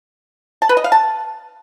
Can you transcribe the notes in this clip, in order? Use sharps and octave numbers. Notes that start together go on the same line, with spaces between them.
A5
B4
D#5
F5
A5